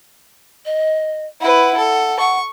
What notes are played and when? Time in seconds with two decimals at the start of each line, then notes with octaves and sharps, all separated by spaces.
0.66 D#5
1.41 E4 B4 F#5
1.77 A4
2.20 F#5 C#6